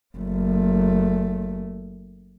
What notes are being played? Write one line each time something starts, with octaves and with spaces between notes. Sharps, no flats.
F#1 A3